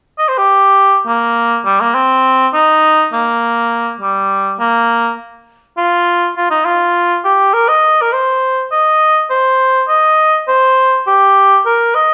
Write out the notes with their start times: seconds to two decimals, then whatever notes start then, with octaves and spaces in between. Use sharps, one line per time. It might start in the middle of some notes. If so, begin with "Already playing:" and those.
0.19 D#5
0.29 C5
0.38 G4
1.07 A#3
1.65 G3
1.81 A#3
1.95 C4
2.54 D#4
3.13 A#3
4.01 G3
4.59 A#3
5.77 F4
6.37 F4
6.50 D#4
6.65 F4
7.25 G4
7.54 A#4
7.69 D#5
8.02 A#4
8.12 C5
8.72 D#5
9.30 C5
9.89 D#5
10.48 C5
11.07 G4
11.66 A#4
11.95 D#5